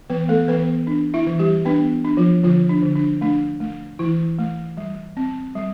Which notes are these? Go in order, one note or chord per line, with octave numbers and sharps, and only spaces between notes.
E3 B3 B4
A3 A4
E3 B3 B4
D4
E4 E5
E3
G3 G4
B3 D4 B4
D4
F3 F4
D3 F3 F4
D4
D3
D4
A3 D4
A3
E3 E4
A3
G3
C4
G3